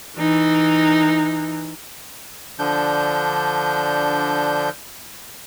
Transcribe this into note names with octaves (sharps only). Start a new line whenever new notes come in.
E3 D#4
D3 F3 D4 G6